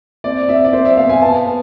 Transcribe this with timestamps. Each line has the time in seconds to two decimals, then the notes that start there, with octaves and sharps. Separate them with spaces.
0.24 C4 D5
0.49 C4 E5
0.64 D5
0.73 C4 C5
0.85 E5
0.97 B2 F5
1.09 G#5
1.21 B3 A5
1.46 B3